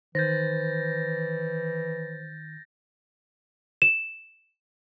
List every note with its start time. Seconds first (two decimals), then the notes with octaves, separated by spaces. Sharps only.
0.15 D#3 E3 C5 G6 A6 A#6
3.82 E7